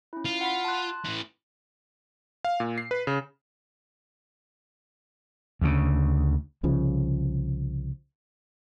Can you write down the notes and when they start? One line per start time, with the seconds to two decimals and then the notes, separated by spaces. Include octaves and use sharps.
0.13 C#4 E4
0.25 F4
0.41 F#5 B5 B6
0.65 A5 C6 F#6
1.05 A2 E3
2.45 F5
2.60 A#2
2.78 C7
2.91 B4
3.07 C#3
5.61 D2 C#3
6.63 C2 C#3 F3